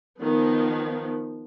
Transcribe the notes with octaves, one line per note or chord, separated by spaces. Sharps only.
D#3 F3 B3